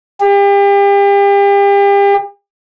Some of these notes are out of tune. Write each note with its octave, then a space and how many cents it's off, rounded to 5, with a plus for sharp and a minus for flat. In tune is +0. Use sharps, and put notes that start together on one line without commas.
G4 +35